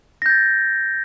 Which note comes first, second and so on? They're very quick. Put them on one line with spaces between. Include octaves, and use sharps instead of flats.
A#6 G6 A6